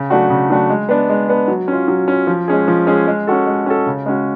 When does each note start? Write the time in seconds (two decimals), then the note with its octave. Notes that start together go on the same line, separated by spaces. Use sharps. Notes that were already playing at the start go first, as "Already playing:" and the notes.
Already playing: C#3
0.10 F#3 A3 D4 F#4
0.30 C#3
0.50 F#3 A3 D4 F#4
0.70 G#3
0.89 B3 D4
1.09 G#3
1.29 B3 D4
1.48 F#3
1.68 C#4 F4
1.88 F#3
2.08 C#4 F4
2.27 F3
2.48 G#3 C#4 G#4
2.68 F3
2.87 G#3 C#4 G#4
3.07 G#3
3.27 C#4 F#4 A4
3.47 G#3
3.66 C#4 F#4 A4
3.87 C#3
4.06 G#3 C#4 F#4